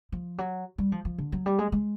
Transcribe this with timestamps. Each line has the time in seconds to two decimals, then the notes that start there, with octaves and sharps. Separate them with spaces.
0.12 F3
0.38 F#3
0.78 G3
0.92 F3
1.05 F3
1.18 D3
1.32 F#3
1.46 G3
1.59 G#3
1.72 G#3